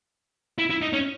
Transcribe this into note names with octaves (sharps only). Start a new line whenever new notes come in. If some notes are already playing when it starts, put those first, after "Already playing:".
E4
E4
D#4
C#4